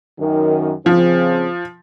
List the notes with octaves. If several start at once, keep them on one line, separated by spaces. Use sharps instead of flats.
F#2 D#3
C#3 F3 C4